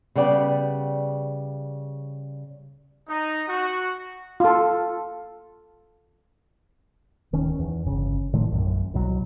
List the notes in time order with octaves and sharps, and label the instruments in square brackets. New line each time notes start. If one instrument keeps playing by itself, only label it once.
[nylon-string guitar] C#3 G3 B3 D5 G5
[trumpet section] D#4
F#4
[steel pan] F4 A4
[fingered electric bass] D1 D#3 C#4
E2
G1 C#3
A2 D#3 F3 A3
A#1 F#2
C2 B2 F#3